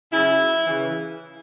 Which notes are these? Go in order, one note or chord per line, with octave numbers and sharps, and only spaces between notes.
C#3 F#3 E4
C#3 E3